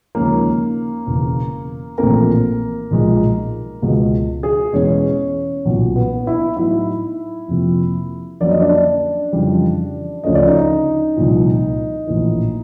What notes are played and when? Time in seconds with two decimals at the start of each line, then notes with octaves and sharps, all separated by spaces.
0.15 D#2 C#3 F3 G#3 A#3 C#4 A#4
1.07 E1 E2 C#3
1.98 A#1 A2 E3 A3 A#3 C4 A#4
2.91 B1 A#2 F3 G#3
3.82 C#2 B2 G#3
4.43 G#4
4.73 E2 B2 G#3 C#4 C#5
5.65 B1 A#2 F#3 B3
5.96 B3 B4
6.27 E4 E5
6.57 A2 F#3 B3 D#4 E4 E5
7.48 F2 C3 F3 A#3
8.40 F2 D3 F#3 A#3 C#4 D5
8.51 D#5
8.61 D4 D5
9.33 F2 C#3 E3 G3
10.24 D2 C#3 F3 A3 C#4 D#5
10.35 D5
10.47 D#4 D#5
11.16 C2 A#2 F3
12.07 A#1 A2 E3